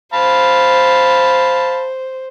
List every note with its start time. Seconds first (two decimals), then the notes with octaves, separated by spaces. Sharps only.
0.13 C5 F5 A5 B5